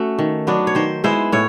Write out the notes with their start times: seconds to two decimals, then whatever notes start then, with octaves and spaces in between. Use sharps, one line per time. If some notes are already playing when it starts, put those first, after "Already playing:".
Already playing: A3 C#4 F#4
0.19 D#3
0.47 F#3 B3 D4
0.67 C#5
0.75 D#3 C5
1.04 G#3 B3 E4 C5
1.32 A2 C#5